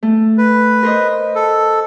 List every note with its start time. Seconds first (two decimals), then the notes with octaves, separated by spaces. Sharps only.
0.03 A3
0.38 B4
0.83 A#4 C5 D#5
1.35 A4